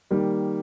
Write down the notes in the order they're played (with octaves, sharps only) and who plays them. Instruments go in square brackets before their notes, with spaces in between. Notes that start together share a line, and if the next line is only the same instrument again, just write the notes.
[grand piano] D#3 G3 A#3